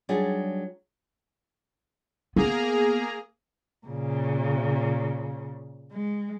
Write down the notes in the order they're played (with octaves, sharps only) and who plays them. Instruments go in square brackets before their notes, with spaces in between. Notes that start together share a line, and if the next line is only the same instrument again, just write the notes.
[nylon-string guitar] F#3 G3 D4 D#4 G#4
[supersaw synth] A#3 G#4 A#5 [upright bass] B3
[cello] A#2 C#3
G#3